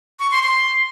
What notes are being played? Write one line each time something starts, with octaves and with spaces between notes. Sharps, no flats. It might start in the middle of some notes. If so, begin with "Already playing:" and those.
C#6
C6
C6